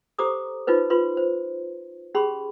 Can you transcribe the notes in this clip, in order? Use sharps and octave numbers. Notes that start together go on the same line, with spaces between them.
G4 A4 C5 A#5 D6 D#6
D#4 F4 B4 C5
F4 B4 C6
C5
C#4 G4 G#4 B5 C6